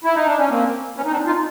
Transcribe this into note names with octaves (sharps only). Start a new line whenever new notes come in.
E4
D#4
D4
C#4
A#3 C4
B3 C#4
D#4
C4 D4
D#4 F4